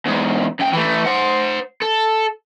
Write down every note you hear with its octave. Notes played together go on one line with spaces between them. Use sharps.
E2 G#2
F#2 G5
E3 A3
C5 F#5
A4